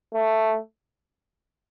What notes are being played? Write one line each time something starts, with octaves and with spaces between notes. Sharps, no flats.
A3